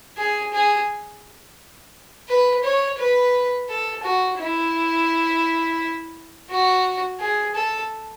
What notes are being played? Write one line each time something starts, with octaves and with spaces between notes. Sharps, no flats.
G#4
G#4
B4
C#5
B4
A4
F#4
E4
F#4
G#4
A4